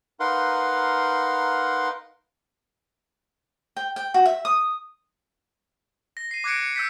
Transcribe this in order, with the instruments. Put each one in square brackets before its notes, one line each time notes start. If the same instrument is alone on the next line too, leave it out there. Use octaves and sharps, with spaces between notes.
[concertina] D#4 A#4 B4 F5 F#5 C6
[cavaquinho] G5
G5
F#4
E5
D#6
[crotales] A#6
C7 D#7
D6 F#6 G#6 A#6 C#7 D7
C#7
E6 G6 B6